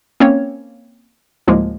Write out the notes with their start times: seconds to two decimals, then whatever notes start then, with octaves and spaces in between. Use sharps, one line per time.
0.20 A#3 C4 C#4 C#5
1.48 D2 A2 F3 G#3 A#3